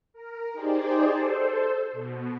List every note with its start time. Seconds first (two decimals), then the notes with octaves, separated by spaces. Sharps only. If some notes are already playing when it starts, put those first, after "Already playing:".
0.13 A#4
0.53 D#4 G4 G#4 C5 D5
1.11 A4 C5
1.93 B2